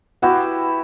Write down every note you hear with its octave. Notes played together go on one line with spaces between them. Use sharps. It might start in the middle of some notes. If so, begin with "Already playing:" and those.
B3 E4 F#4 G4